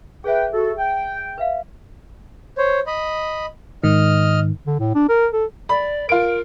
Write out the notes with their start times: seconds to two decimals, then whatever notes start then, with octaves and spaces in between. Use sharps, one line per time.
0.24 G#4 B4 E5 G5
0.53 F#4 A4
0.78 G5
1.38 B4 E5 F5
2.58 C5 C#5
2.87 D#5 B5
3.84 G#2 D#3 D#5 F6
4.67 D3
4.80 A2
4.95 D4
5.09 A#4
5.33 A4
5.69 D5 B5
6.09 F4 A#4 D7